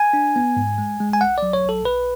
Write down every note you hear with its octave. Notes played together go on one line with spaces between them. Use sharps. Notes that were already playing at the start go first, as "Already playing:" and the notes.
Already playing: G#5
D4
B3
G#2
G#3
G#3
G#5
B1 F#5
F#3 D5
C#5
B1 A4
B1 B4